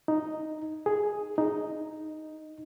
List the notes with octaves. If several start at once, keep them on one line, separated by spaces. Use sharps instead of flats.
D#4
G#4
D#4